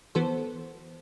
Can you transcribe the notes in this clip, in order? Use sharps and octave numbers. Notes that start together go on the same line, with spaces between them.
E3 B3 F#4 A4 C5